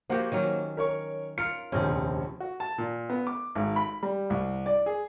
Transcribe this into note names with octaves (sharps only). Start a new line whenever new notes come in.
F3 A#3 F#4 G4 F#5
D#3 F#3 C#4
A#4 C#5 C#6
F4 A#4 C#7
F1 A#1 D#2 C4 C#4
F#4
A5
A#2
B3
D6
G#1
B5
G3
C2
D5
G#4